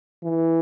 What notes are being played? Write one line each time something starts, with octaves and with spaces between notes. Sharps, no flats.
E3